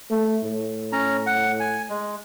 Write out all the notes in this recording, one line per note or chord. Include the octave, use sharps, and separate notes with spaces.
A3
A2
C#4 A#5
F#5
G#5
G#3